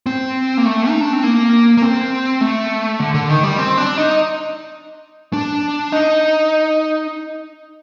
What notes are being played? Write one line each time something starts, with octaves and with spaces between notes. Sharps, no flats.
C4
A#3
A3
D#4
D4
C4
A#3
A#3
C4
A3
D3
D3
D#3
G3
C4
D4
D#4
D4
D#4